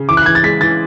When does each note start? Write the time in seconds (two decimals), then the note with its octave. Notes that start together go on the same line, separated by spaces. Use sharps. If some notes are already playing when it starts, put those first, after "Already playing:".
Already playing: C#3
0.09 E3 D6
0.17 F#6
0.26 E3 G#6
0.35 A6
0.43 G#3 B6
0.61 E3 A6